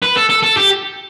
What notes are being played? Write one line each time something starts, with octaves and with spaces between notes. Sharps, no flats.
B4
A4
A4
A4
G4